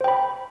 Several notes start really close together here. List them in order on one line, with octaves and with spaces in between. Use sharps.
C5 G5 B5